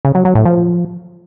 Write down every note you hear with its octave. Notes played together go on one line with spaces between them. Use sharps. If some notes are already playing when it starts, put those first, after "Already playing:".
C#3
F#3
F#3
A2
F3